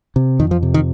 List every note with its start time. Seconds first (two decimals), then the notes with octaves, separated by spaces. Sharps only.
0.16 C3
0.39 F2 D#3
0.51 F3
0.63 C3
0.74 D#3